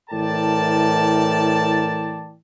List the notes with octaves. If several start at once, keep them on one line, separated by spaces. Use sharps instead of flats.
A2 E3 A#4 D5 G5 A5